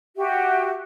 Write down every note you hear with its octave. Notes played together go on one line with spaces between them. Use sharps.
F#4 G4 E5